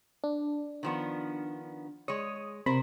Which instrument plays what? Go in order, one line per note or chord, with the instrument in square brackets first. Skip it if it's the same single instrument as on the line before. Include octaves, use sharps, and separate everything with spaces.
[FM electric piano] D4
[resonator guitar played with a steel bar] D#3 F3 B3
[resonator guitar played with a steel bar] G#3 C#5 [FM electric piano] D#6
[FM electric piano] C3 B5 [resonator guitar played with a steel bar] A#4 C5